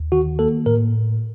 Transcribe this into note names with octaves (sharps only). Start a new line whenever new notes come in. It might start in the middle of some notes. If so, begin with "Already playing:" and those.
Already playing: D#2
D#3 F#4
A#3 A4
A2 A#4